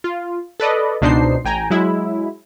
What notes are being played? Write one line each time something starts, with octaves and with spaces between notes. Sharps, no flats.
F4
A4 B4 D5 D#5
C#2 B2 D4 D#4 C5 C7
A1 G5 G#5 A#5
F#3 G#3 E4